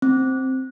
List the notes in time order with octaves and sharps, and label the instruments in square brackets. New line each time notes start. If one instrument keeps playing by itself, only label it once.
[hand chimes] C4